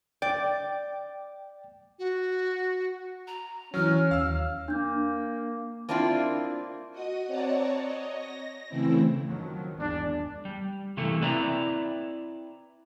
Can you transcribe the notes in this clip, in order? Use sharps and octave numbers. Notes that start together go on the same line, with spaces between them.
D5 G5
F#4
A#5
E3 F#3 C#4 C#5 F6
D#2 F5 E6
A#3 D4 G6
A#3 C4 D4 E4 F4
F#4 D#5 D#6
C4 C#5 D5 F#5 A5 A#5
C#5 D#5
A#6
C#3 E3 A3 C4 E4
D#3 F3 F#3
G#1 E2 G#3 D4
G3
C3 E3 A3 A#3 A4
C4 E4 B4 D5 E5 A#5